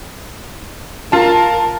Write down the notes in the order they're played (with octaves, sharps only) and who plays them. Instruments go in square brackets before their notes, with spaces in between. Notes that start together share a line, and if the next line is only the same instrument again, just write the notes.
[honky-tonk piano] F4 A5 [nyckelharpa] A#4